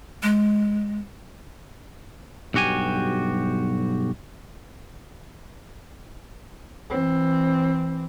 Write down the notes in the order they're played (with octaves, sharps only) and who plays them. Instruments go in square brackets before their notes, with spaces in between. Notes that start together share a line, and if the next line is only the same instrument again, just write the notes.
[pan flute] G#3
[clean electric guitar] B1 G2 F#4 G4 G#5
[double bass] E3 C4